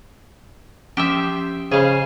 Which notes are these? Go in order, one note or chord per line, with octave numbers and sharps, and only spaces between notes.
F3 C#4 G4 C5 E5 D#6
C#3 G#4 C5 D#5 F5 B5